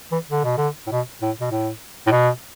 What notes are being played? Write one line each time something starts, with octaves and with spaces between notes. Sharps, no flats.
E3
D3
B2
D3
A2
B2
A2
B2
A2
A2
B2